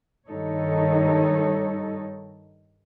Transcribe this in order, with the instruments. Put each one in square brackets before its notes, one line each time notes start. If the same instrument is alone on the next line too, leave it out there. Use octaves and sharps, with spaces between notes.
[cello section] G2 D#3 G3 D#4 A4 C#5